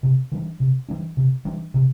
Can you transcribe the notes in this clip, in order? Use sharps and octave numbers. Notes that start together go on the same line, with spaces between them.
C3
E3 G3 D4
C3
E3 G3 D4
C3
E3 G3 D4
C3